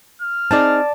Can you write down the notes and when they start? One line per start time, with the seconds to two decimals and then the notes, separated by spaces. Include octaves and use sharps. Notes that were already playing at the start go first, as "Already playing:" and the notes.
0.22 F6
0.51 C4 D#4 G#4 D5 A5